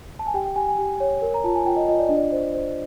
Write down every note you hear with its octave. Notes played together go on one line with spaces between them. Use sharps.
A5
G#5
G4 G5
G5
G4 G#5
G#5
G4
C#5
A#4
A#5
F4 A5
G#5
F4 G5
D#5
F4 D#5
D5
D4 D#5
D5
C5
C5